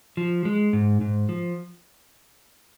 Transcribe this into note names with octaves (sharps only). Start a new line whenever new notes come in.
F3
G#3
G#2
G#2
F3